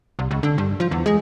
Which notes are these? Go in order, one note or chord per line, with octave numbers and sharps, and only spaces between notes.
C2
C#2
D3
G2
F3
E2
G#3